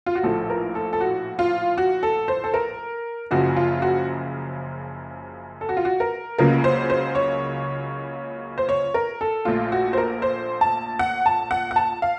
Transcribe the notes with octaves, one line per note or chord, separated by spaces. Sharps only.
F4
F#4
A#1 A2 F3 A4
A#4
A4
A4
F#4
F4
F#4
A4
C5
A4
A#4
F#1 F#2 C#3 F3 F#4
F4
F#4
A4
F#4
F4
F#4
A#4
C#2 C#3 F#3 A#3 A#4
C5
C5
C#5
C5
C#5
A#4
A4
A#1 A#2 A3 F4
F#4
C5
A#4
C5
A5
F#5
A5
F#5
F#5
A5
F5